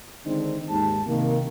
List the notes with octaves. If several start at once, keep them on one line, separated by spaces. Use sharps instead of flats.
D3 D#3 G#3 C4 D4 D#4
D#2 G#2 G4 A5
C3 D#3 A#3